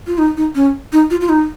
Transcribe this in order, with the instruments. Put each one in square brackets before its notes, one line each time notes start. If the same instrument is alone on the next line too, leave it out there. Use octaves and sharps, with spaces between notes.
[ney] F4
D#4
D#4
C#4
D#4
F4
F4
D#4